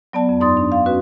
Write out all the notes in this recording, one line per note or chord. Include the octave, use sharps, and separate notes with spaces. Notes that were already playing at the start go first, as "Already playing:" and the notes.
F#3 B3 D5 A5
F2
G2 D#4 D5 C6 D#6 A6
D4
F5
C#4 F#4 B4